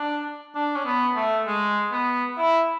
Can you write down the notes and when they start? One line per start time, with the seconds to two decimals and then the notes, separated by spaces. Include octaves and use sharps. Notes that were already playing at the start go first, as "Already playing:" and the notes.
Already playing: D4
0.55 D4
0.76 C#4
0.86 B3
1.16 A3
1.47 G#3
1.92 B3
2.38 E4